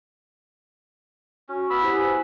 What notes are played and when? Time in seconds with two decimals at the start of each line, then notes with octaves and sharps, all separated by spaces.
1.49 C#4 F#4
1.70 B3 B5 E6
1.81 E4 G4 C5
1.93 G#5
2.08 B4